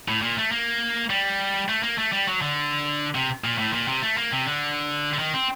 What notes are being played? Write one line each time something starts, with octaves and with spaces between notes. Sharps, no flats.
A2
A#2
A3
A#3
G3
A3
A#3
A3
G3
F#3
D3
C3
A#2
A2
A#2
C3
A3
A#3
C3
D3
D3
D#3
C4